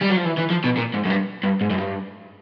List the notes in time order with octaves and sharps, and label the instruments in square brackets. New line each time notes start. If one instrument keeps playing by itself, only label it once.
[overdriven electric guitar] G3
F#3
F3
E3
E3
F3
B2
A#2
G#2
F#2
G2
G2
G#2
F#2
G2